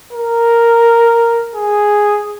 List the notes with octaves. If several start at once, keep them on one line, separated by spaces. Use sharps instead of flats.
A#4
G#4